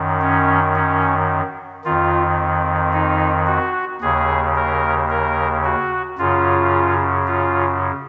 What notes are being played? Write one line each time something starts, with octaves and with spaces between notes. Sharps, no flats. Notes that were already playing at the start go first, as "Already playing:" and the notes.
Already playing: F#2 D#3
C#4
C#4
F2 D#3 F4
D#4
F#4
D#2 C#3 G#4
A#4
A#4
F#4
F#2 C#3 F4
F4